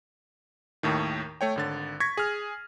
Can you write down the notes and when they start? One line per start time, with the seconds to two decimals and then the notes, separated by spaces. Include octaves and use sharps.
0.83 D#2 A2 D#3
1.41 A3 C#5 G5
1.56 G#1 D3 A6
2.00 C#6 G#6 A#6 B6
2.17 G#4 F6